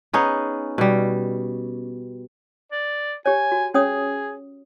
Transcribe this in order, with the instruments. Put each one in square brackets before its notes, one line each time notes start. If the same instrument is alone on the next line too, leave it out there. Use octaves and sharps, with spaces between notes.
[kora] B3 C#4 D#4 G#4
B2 G3
[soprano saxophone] D5
[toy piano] G4 C#5 [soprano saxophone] G#5
[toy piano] F#4
[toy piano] C#4 C#5 D#6 [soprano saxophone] G#4